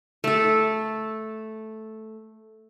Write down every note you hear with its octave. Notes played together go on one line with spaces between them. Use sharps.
A3 A4